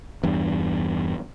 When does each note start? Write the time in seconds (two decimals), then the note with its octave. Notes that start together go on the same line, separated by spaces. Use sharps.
0.23 E2 G2